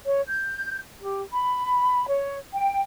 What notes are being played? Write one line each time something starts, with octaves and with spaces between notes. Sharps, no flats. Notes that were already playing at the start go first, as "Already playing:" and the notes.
C#5
G6
G4
B5
C#5
G5